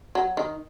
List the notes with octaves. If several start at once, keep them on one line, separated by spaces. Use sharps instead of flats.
F#3
D#3